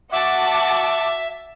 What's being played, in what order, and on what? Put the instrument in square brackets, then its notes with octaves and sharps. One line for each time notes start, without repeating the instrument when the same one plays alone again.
[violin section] F#4 F#5 A5 [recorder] E5 [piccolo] D6